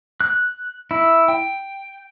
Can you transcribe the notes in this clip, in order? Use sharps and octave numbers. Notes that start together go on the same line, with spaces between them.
F#6
E4
G5